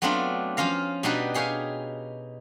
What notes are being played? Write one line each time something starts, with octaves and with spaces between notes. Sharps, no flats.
F#3 A3 B3 C4 D4 F4
F3 C#4 F4 F5 A#5
B2 G3 D4 D#4 F#4 B4
G4 G#4 C#5 F5 G#5